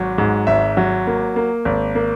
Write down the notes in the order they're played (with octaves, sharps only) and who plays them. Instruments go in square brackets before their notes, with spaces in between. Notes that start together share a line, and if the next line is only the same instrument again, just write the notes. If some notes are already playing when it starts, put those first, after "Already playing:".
Already playing: [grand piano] G#1 F#3
G#2
G#1 E5
F#3
A#3
A#3
G#1
A#3